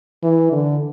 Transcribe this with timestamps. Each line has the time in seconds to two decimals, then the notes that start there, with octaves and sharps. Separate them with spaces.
0.23 E3
0.52 D3